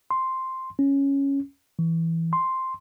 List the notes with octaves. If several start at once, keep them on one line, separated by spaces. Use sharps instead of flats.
C6
C#4
E3
C6